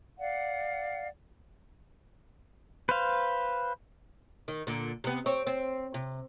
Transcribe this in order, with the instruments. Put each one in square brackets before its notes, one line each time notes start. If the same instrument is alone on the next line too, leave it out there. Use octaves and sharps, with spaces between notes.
[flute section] D5 F5 F#5
[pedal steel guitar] B4 C5 F5
[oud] D#3
A#2 D3
C3 B3
C4 C#5
C4
C3